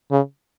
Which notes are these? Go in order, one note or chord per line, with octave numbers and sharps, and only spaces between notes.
C#3